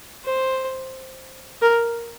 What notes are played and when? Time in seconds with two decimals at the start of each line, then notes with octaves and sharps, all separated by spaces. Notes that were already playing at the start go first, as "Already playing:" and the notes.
0.24 C5
1.62 A#4